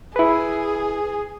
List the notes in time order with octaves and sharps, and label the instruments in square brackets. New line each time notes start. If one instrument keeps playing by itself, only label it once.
[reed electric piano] E4 B4 [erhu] G#4